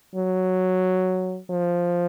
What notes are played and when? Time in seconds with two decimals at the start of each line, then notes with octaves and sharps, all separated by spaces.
0.15 F#3
1.51 F3